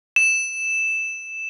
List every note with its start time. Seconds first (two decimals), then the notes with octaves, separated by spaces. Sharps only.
0.16 E7